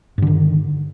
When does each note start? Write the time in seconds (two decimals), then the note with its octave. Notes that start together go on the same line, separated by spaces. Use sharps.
0.18 G2
0.22 D3
0.27 D#3